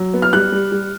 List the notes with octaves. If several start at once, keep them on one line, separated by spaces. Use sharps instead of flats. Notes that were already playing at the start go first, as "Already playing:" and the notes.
Already playing: F#3
B3
F6
G3 F#6
G3
G3